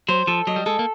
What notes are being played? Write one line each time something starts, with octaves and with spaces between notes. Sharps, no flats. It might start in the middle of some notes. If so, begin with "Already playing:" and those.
F#3 C5
F3 A4
F#3 D#5
G3
G#3 A4
A#3